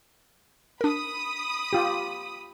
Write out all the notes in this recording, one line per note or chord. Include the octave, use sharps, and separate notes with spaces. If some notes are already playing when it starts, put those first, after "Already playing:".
D4 A#4 B5 D#6
F4 G4